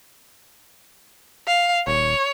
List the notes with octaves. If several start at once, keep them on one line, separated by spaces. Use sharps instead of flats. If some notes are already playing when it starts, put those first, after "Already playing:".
F5
D#1 C#5